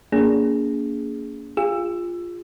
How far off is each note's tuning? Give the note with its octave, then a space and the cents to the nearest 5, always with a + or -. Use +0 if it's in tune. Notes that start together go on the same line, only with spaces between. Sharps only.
A#3 +0 D4 -45 G#4 +0
F4 +0 G#4 -40 E6 +15